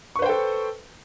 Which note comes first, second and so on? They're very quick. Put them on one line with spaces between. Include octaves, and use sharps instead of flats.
C#6 B4 C5 G5 A4